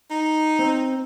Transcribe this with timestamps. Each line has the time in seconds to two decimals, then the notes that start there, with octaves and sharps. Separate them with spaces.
0.10 D#4
0.59 C4